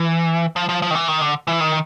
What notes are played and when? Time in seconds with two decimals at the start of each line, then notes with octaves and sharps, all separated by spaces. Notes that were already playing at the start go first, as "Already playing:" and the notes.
Already playing: E3
0.56 F3
0.69 F3
0.82 F3
0.91 D#3
0.95 E3
1.08 D#3
1.21 D3
1.47 E3
1.60 D#3